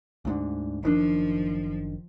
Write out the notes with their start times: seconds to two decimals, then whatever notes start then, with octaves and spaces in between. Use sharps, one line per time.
0.25 D2 G#2 D3
0.83 F#1 D#3 F3 D4